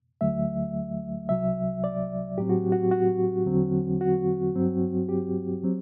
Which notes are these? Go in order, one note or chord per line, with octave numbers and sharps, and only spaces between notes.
D2 D3 F#3 A3 E5
C2 C3 F#3 E5
D5
A2 F#3 C4 G4
F#4
F#4
F#4
E2 D3 F#3 C4
F#4
G2 F#3 C4
G4
F#3 C4